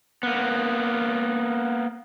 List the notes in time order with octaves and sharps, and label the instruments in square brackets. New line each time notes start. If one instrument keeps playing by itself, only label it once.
[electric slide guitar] A#3 B3